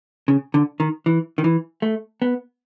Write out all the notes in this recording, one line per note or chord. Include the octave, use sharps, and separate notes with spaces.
C#3
D3
D#3
E3
D#3
E3
A3
B3